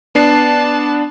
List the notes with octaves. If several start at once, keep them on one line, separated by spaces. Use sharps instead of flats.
B3 D4 A5 C7